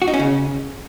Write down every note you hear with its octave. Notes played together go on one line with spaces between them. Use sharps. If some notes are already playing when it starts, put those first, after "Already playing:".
F#4
D#4
C#4
C#3